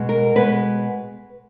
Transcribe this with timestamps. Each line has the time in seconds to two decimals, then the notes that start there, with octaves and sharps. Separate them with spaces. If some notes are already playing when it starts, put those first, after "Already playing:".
Already playing: B2 G#3 B3
0.09 A#4
0.35 B2 G#3 B3 B4